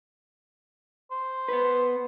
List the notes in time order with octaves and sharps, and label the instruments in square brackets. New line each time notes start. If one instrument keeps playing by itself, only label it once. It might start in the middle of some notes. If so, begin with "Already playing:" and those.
[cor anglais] C5
[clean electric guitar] B3 B4